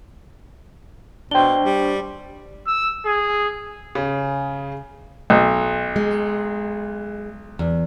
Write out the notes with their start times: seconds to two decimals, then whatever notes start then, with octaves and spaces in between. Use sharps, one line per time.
1.31 B2 D4 C5 G5 G7
1.64 G3
2.67 E6
3.05 G#4
3.95 C#3 G#4
5.30 B1
5.96 G#3
7.59 E2